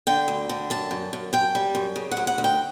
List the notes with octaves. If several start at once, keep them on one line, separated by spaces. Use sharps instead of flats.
D3 G5
D2
D3
F#2 A5
F#2
F#2
F#2 G5
G3
F#2
C#3
F#5
D2
F#5
D2
G5